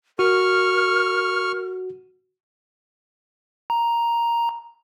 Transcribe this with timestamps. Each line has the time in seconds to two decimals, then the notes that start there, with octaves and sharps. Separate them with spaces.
0.19 F#4 A#4 C#6 F6
3.70 A#5